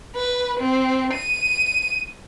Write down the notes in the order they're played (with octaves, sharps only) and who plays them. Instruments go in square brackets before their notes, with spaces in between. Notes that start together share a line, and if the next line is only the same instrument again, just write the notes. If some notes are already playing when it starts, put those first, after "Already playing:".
[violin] B4
C4
D#7